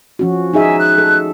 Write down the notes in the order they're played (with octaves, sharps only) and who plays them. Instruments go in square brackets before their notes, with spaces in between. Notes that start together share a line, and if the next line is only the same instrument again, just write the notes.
[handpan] F3 C#4 F#4
[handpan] D#4 G#4 E5 [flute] G#5
[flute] F#6
[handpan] A4